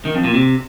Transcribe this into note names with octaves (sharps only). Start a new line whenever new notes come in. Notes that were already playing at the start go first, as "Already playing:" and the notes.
D#3
F2
A#2
C3